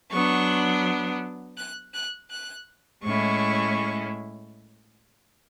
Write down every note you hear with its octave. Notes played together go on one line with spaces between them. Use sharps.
F#3 B3 D4 C#6
F#6
F#6
F#6
A2 G#3 C#4 E4 C#6